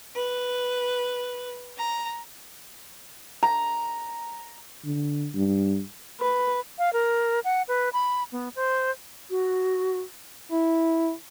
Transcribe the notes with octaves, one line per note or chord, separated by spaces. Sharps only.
B4
A#5
A#5
D3
G2
B4
F5
A#4
F#5
B4
B5
B3
C5
F#4
E4